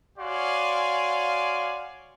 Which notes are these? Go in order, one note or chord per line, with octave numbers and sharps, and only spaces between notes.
F#4 C#5 D5 F5 G#5 C6